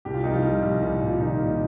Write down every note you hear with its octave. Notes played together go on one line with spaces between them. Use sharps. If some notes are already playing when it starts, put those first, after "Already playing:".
C2 G4
F4
C2 D#4
F3 F4
G3
C2
C2
A#2
F4
C2 D#3 D#4
A#2